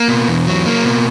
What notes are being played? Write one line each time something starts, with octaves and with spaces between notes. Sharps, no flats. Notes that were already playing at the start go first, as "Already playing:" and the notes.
Already playing: A#3
B2
E2
F#3
A#3
B2